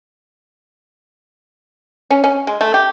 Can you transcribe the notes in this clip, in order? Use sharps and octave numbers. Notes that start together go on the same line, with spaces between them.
C#4
C#4
G#3
A3
G4